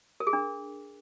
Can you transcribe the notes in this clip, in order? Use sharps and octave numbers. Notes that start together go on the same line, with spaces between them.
A#4
G#4
D4